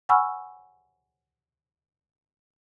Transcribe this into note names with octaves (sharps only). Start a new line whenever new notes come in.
F#5 G#5 B5 C#6 E6 F6